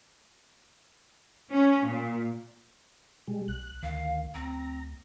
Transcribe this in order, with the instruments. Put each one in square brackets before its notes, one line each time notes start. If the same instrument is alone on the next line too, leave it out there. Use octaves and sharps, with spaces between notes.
[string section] C#4
A#2
[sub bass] B2 [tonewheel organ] G3 G#3
[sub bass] B1 [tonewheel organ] F#6
[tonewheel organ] D2 [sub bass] D#3 [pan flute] F5
[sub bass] D2 [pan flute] C4 [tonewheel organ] A#5